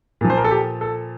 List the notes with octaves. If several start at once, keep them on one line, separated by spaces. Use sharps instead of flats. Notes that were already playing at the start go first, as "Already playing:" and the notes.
A#2 F3
C5
A#4
A4
G4
A4